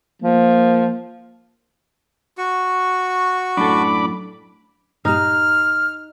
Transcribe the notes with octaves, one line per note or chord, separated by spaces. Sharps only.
F3 A#3
F#4 C#6
F#2 A2 D4 A4 B5 D6
G2 A#2 D#4 G4 F6